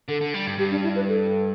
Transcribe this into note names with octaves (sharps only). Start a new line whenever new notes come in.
D3 A4
D3
G3
G2
G2 G4
D4
E4
B4
A4